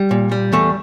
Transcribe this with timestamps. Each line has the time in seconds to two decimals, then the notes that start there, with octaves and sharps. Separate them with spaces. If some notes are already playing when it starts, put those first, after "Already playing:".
Already playing: G3
0.11 A#2
0.32 G3
0.53 E2 A3